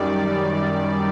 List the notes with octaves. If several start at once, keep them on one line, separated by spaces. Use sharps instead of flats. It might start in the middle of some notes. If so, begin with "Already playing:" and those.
Already playing: F#2 D#3 G3 D5